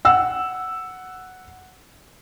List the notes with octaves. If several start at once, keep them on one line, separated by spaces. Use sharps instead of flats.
F#5 E6